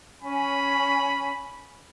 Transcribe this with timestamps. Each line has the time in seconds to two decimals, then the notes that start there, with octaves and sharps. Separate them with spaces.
0.22 C#4 G#5 B5